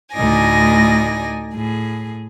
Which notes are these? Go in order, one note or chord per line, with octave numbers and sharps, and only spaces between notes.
D2 A2 D#4 D5 G#5 A#6
A2 G#4